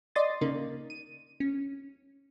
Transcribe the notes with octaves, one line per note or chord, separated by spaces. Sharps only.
D5 D#5 C6 D#6 A6
C#3 A#3 D#4
D#7
C#4